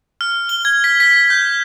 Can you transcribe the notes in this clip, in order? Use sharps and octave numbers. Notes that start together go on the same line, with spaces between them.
F6
G7
G#6
B6
B6
G6